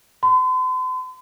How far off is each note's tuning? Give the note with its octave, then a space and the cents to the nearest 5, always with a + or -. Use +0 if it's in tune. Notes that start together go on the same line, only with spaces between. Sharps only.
C6 -45